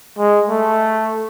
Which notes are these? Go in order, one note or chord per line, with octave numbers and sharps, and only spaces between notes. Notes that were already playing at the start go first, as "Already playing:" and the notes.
G#3
A3